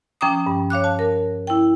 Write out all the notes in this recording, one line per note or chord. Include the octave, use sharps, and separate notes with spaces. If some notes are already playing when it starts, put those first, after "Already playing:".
F3 C#4 G5 A#5 D6 D#6
G2
C#5 F5 D6 F#6
A5
A#4
E4 G5